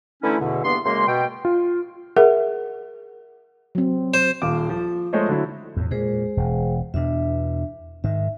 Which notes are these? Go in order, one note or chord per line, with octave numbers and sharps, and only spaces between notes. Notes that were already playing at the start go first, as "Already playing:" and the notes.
D3 E3 A3 C#4 D#4 E4
E2 B2 D3
E2 G2 A#3 B3 C6
F#2 C#3 G#3 A#3 C6
B2 G5
F4
G#4 A#4 E5 F#5
F#3 C4
C5
D#1 D#2 F5 D6
F3
F3 G#3 A3 C5 C#5 D#5
D3 F#3 E4
E2 A2
A#2 G#3 G#4 C5
E1
E2 B2 D4 E5
G#2 D#3 E5